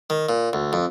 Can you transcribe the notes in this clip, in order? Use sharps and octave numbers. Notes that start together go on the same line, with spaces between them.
D#3
A#2
D2
F2